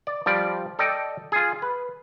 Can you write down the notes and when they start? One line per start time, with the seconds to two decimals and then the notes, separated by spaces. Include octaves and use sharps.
0.07 D5
0.26 F3 G3 D5
0.79 A4 D5 D#5 G5
1.32 F4 G#4
1.62 B4